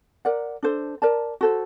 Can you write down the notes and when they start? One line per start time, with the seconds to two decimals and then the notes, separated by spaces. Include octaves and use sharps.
0.25 A#4 D5 F#5
0.63 D4 A4 C5
1.02 A#4 D5 A5
1.41 F#4 A4 C5